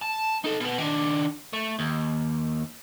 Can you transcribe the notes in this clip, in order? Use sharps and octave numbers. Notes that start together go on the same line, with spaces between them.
A5
D#4 A4
B2 B3
D#3 D4
A3
D#2